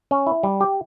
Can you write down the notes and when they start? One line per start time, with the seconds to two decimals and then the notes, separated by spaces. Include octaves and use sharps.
0.11 C#4
0.27 E4
0.43 G3
0.61 G4